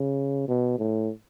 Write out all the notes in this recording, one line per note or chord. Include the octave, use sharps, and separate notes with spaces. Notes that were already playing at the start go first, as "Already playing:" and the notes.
Already playing: C#3
B2
A2